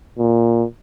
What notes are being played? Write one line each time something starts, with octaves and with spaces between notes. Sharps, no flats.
A#2